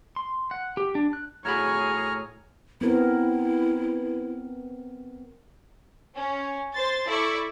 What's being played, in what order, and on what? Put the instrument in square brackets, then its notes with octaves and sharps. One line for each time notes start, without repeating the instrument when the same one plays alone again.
[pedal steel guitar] C6
F#5
G4
D4
F#6
[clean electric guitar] A2 F#4 B5 [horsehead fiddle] G#4 C#5 [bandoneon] A#5 F6 [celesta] G#6
[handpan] B3 C4 A#4 [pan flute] E4
[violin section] C#4
C5 C6 A6
E4 A4 D5 B5 C#6